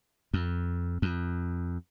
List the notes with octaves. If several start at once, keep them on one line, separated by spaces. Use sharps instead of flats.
F2
F2